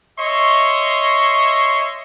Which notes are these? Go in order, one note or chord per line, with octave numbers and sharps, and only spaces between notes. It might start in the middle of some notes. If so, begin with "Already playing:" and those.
C#5 D#5 E5 C6 C#6